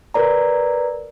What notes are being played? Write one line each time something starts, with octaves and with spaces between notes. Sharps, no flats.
A#4 B4 D5 A#5